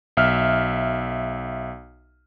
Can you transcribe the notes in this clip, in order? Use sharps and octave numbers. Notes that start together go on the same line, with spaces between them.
B1 E5 F6